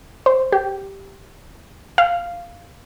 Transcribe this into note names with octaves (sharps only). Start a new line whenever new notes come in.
C5
G4
F5